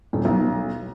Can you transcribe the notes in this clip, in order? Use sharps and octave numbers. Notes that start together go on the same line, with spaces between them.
D#1
B1